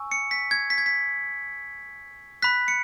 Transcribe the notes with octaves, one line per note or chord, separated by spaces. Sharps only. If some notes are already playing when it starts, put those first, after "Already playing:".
Already playing: G#5 C#6 E6
C#7
B6
G#6
B6
G#6
B6
B5 F#6 B6
C#7